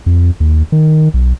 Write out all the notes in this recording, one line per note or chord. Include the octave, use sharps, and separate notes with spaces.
F2
D#2
D#3
B1